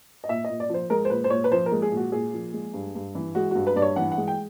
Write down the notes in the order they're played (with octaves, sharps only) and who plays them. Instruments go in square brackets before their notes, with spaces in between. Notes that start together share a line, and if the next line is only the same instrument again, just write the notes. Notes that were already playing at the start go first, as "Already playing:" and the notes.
[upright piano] D#5
A#2 E5
D#5
A#2
D5
F3 C5
G#3 A#4
C5
A#2 B4
C5
A#2 C#5
B4
F3 C5
A#4
G#3
G#4
A#2
F#4
A#2 G#4
F3
G#3
G2
G2
E3
G#3 F#4
G2 F#4
B4
G2 D5
C#5
E3 F#5
F#5
G#3
G5